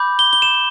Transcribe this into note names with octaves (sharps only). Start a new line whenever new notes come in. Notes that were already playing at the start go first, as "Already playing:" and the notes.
Already playing: B5 D6 G6
G7
G7
E7